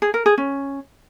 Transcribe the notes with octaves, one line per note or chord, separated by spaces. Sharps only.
G#4
A#4
G#4
C#4